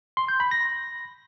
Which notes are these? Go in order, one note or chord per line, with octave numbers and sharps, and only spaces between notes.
C6
G6
B5
A#6